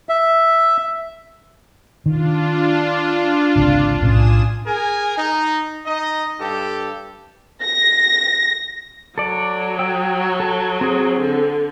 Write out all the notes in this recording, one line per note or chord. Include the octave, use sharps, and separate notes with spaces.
E5
D#3 D4 F4
G#1 C#2 C3
B1 A2 C#4 G#5 D#6 E7
G#4 A#4 G#5
D#4
D#4 D#5
G2 G4 A4
A#6
F#3 A4 D5
G5 E6
A4
C4 G#4
D3